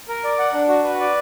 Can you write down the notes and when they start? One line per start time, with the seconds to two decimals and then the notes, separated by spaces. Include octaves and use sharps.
0.09 A#4
0.24 D5
0.39 F#5
0.54 D4
0.69 F#4
0.84 B4
1.00 D5